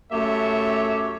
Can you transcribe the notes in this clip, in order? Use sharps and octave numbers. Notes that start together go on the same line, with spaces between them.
F#2 A3 G4 C#5 E5